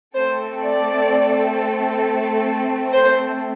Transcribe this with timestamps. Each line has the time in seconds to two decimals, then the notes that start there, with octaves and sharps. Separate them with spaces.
0.15 A3 C4 A4 C5
0.63 D5
2.94 C5